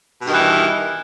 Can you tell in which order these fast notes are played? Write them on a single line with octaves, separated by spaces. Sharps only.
B2 G2 D#3 E3